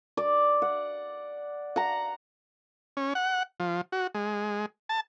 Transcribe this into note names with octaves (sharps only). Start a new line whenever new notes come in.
D5
F#5
F#5 A#5
C#4
F#5
F3
F#4
G#3
A5